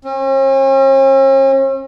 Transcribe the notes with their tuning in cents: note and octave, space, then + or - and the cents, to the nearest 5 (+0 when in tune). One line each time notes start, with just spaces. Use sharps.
C#4 -45